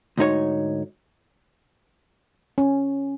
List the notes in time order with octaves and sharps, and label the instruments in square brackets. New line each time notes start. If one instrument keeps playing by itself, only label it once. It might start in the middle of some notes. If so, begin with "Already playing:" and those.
[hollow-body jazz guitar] D2 G#2 D#4 C#5
[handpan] C#4